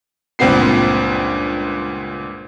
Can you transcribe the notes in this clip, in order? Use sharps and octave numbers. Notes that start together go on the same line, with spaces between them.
C#2 G2 A#2 B3 C4 C7